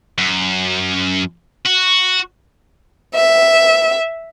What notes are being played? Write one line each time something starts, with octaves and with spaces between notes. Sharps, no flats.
F#2
F#4
E5